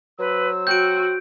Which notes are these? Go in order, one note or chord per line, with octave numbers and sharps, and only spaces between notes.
F#3 B4 C5 E6
F#4 G5 G6 D7